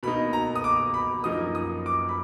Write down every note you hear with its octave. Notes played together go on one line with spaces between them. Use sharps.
B2 A#3 D#4 B5
A#5
D#6
D6
B5
F#2 F3 A#3 D#4 D#6
D#6
D6
B5